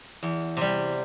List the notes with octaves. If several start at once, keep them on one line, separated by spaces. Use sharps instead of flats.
E2
C3 G3